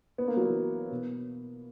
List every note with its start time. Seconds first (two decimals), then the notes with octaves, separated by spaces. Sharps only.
0.18 B3
0.28 A#3
0.37 F#3
0.46 E3
0.91 B2